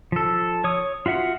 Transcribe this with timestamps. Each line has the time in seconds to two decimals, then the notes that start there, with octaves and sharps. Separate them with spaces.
0.12 F3 A4
0.64 C#5 D#6
1.06 F4 F#4 E5 F#5